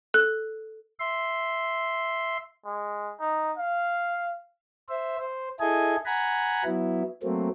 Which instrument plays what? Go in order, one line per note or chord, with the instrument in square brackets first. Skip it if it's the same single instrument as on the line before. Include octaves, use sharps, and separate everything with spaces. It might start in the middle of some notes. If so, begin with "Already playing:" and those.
[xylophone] A4 F#6
[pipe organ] E5 C6
[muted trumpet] G#3
D#4
F5
[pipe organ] C5 E5
C5
E4 G#4 A4 D#5 G#5
F#5 G#5 A#5 B5
F#3 B3 E4
F#3 A3 A#3 C4